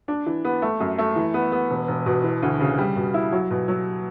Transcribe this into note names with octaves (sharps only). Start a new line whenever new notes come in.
D4
E3
B3
A3
F#2
A3
E3
B3
B3
E1
E1
B2
E3
D2
C#3
G3
B2
E4
F#3
B2
F#3